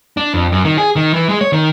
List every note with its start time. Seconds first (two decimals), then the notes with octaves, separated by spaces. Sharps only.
0.17 D4
0.34 F2
0.52 F#2
0.65 D#3
0.78 G#4
0.96 D#3
1.14 E3
1.29 G#3
1.41 C#5
1.53 D#3